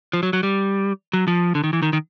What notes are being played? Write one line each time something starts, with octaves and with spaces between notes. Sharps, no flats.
F3
F#3
F#3
G3
F#3
F3
D3
D#3
E3
D#3
D#3